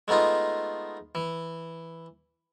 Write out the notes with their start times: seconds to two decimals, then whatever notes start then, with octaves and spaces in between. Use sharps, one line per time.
0.08 G#3 A3 B3 D#4 F4
1.15 E3